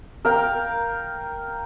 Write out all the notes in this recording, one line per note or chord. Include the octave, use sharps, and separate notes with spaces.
A#4 F5 G5